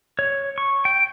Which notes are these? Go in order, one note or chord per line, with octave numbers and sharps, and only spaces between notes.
C#5
C#6
G5